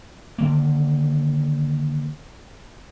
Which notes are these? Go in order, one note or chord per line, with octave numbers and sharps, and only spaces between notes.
D3 D#3 A#3